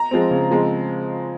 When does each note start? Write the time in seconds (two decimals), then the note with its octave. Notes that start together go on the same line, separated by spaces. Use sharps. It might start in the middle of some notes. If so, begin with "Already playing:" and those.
Already playing: A#5
0.11 F3 G#3 C4
0.31 C#3
0.50 F3 G#3 C4